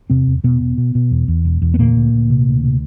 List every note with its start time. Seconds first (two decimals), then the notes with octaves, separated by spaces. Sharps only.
0.10 E2 C3 C4
0.27 E2
0.43 E1 B2 B3
0.61 B2
0.78 B2
0.95 B2
1.11 E2
1.28 E2
1.45 E1
1.62 E2
1.74 B3
1.79 D2 A#2 A#3
1.96 D2
2.13 D2
2.30 C3
2.47 D2
2.64 C3